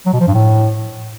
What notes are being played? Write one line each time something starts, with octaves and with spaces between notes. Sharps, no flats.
F#3
B2
F3
G2
A2